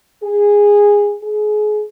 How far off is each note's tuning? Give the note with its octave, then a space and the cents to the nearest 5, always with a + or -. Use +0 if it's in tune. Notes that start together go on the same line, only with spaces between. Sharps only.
G#4 -15
G#4 +30